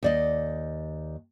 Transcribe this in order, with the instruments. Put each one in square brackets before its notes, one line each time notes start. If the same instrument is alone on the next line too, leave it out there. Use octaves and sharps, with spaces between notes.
[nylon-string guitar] D#2 D5 D#5